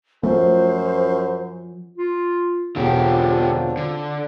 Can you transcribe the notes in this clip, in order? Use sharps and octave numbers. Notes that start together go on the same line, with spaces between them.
F#2 F3 A3 C5
F4
E1 D3 C4 D4 F4 G4
D3